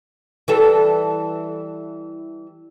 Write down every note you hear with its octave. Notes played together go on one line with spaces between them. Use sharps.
E3 G3 A4